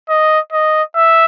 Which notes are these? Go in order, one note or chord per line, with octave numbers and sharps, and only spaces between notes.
D#5
D#5
E5